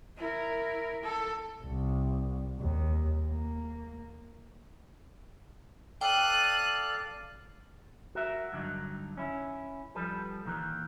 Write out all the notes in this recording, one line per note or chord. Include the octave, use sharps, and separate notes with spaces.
E4 A#4
A4
C2
D#2
A#3
A4 D5 F5 G5 F#6 D#7
F#4 A#4 E5
G2 D3 F#3 D#4
C#4 E4
F3 G3 A4 B4
A#2 D#3 E3